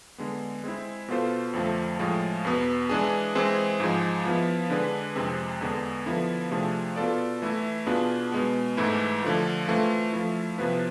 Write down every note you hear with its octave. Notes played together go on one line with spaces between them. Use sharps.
D3 G#3 B3
G#3 C4 E4
B2 B3 F4 A4 C5
F2 D3 F3 A3 C4
A2 F3 G#3
E2 B2 B3
E3 G#3 D4 G#4
E3 G#3 C4 G#4
G#2 F3 G#3
F3 B3 E4
D3 G#3 D4 G#4 B4
F2 C3 G#3 C4
E2 D3 G#3 B3 D4
D3 F3 B3 E4 A4
C3 F3 A3 D4 G#4
B2 B3 F4 A4 D5
E3 A3 E4
B2 B3 D4 F4 G#4
B2 G#3 B3
G#2 E3 A3 E4
D3 F3 A3
E3 A3 C4 F4
F3 A3 E4
C3 F3 B3 E4 B4